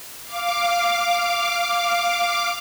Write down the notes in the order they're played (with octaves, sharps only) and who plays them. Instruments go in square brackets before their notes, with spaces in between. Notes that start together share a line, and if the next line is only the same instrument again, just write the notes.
[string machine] F5 D6